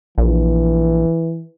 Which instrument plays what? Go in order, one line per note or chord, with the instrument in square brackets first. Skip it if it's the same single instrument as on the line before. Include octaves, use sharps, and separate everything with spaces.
[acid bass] A#1 [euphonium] E3